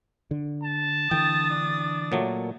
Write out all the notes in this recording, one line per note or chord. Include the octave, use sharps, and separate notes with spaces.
D3
A5
D3 E3 G5 D#6 A6
D4
A#2 F#3 A3